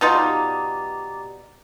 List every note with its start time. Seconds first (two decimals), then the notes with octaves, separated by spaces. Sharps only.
0.01 B2 D#4 F4
0.14 G4 D5 A#5